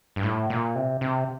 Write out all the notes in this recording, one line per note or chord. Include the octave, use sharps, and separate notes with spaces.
G2
A2
A#2
C3
C3